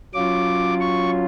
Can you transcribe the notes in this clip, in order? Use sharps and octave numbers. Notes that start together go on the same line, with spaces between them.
F#3 C#4 F4 D6
C#6